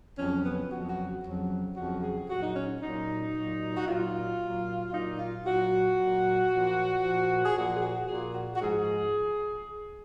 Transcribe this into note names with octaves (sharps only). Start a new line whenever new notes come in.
F2 C#3 F#3 C#4
B3
F2 C#3 F#3 F#4
F#4
F2 C#3 F#3
F2 C#3 F#3 F#4
G#4
A#2 F#3 F#4
D#4
C#4
A#2 F#3 D#4
A#2 F#3
F#4
A#2 F#3 F4
A#2 F#3
A#2 F#3 D#4
F4
A#2 F#3 F#4
A#2 F#3
A#2 F3
A#2 F3
G#4
A#2 F3 F#4
G#4
F#4
A#2 F3 G#4
F#4
F#4
G#2 F3 G#4